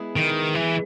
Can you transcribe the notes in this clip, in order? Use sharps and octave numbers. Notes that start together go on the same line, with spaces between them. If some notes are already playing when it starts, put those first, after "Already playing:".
Already playing: G#3 B3 E4 G#4 B4
D#3
E3